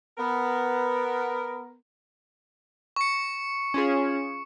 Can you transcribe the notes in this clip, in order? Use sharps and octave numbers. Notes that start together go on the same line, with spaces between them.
B3 A#4
C#6 C#7
C#4 F4 G#4